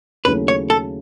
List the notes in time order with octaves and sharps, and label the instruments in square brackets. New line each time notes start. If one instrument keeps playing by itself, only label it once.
[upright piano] D#2 C#3 F#3 A3 E4 [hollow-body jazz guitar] B4
[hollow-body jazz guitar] C#5
A4